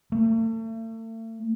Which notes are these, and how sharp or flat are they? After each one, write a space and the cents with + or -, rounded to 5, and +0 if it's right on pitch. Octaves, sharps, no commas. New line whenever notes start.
A3 +40